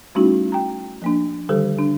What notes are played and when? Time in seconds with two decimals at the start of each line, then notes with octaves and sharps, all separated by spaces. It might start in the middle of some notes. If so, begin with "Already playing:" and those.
0.15 G3 A3 C#4 D#4 E4 F#4
0.52 G5 A#5
1.02 F3 A#3 D4
1.49 D3 D#3 G3 G4 A4
1.79 D4